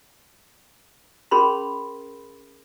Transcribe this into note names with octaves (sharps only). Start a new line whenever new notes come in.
C#4 G#4 A#4 B5 C6